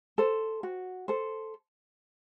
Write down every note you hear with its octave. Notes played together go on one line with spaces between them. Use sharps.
A4 C5
F#4
A4 C5